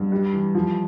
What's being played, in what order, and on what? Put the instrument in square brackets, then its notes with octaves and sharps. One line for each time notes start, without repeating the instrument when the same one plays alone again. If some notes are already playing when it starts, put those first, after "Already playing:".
Already playing: [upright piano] G2
G3
E3
F3